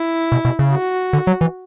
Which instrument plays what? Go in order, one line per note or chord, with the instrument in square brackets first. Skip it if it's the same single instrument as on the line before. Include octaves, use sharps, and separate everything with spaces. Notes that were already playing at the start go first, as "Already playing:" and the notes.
Already playing: [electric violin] E4
[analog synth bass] B2
B2
C#3
[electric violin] F#4
[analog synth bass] D3
F#3
E3